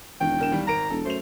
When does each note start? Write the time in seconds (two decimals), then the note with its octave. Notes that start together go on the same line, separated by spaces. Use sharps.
0.21 E1 D#2 G5
0.38 D3 A#4 E7
0.52 D#2 G3
0.68 G#1 A#4 A#5 D7
0.91 E1 A4
1.06 F#2 A3 C5 F7